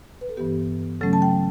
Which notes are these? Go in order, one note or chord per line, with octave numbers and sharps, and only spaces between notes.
B4
A4
G2 E3 B3 G4
C#3 F#3 A3 C#4 A4
A5
G5